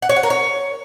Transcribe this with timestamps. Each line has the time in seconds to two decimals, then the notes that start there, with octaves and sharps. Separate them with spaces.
0.02 F#5
0.09 C#5
0.16 F#5
0.23 A#4
0.30 C#5